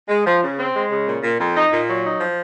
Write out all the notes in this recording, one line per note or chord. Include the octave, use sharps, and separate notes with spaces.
G#3
F3
C#3
C4
G#3
C#3
A#2
A#2
F2
D#4
A#2
F#3
D#4
F3